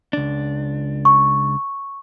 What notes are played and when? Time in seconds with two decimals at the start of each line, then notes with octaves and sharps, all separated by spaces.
0.13 C#2 D4
1.05 C#6